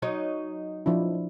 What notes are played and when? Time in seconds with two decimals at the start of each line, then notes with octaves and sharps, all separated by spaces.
0.02 F#3 D#4 C#5
0.86 F3 D4 E4